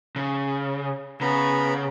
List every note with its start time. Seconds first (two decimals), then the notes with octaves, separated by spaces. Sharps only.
0.16 C#3
1.21 C#3 B3 A#5 B5